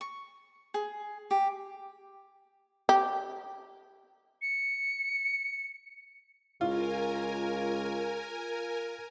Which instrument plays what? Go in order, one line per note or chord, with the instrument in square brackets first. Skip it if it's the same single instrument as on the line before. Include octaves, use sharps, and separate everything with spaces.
[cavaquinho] C#6
G#4
G4
[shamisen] G4
[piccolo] C#7
[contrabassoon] C#2 [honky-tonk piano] F4 [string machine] A#4 G#5